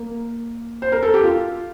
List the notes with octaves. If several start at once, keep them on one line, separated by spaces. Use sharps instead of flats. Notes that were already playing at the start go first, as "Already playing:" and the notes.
Already playing: A#3
C5
A#4
A4
G4
F4